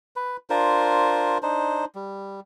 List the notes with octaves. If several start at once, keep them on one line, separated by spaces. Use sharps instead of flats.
B4
D4 F4 A#4 C5
D4 D#4 C5
G3